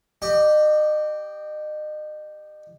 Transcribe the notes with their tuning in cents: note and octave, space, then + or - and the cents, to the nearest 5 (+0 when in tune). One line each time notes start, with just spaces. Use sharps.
G4 -5 D#5 -35